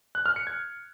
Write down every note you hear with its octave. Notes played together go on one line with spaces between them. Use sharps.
F#6
F6
C#7
G#6